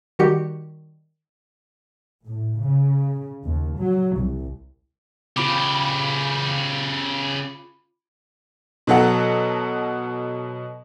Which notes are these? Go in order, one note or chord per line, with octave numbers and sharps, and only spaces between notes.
D#3 G3 F#4 G4 C#7
A2
C#3
D#2
F#3
C2
C#3 F4 G4 B5 D6
B2 F#3 A4 F#5